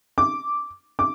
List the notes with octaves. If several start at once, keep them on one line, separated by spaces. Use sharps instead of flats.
D6
D6